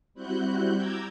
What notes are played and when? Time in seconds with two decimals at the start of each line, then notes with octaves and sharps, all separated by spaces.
0.14 G3 C4 E4 F#4 F#6 G6
0.75 A#5 D6 E6 G6 G#6